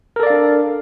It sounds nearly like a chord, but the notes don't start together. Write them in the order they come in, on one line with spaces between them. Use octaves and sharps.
A#4 A4 D5 F5 D4